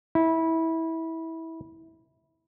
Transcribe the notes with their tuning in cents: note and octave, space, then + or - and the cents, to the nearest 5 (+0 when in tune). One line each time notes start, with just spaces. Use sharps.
E4 -20